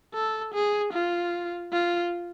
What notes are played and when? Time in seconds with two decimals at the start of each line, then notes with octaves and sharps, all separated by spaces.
0.14 A4
0.54 G#4
0.93 F4
1.73 F4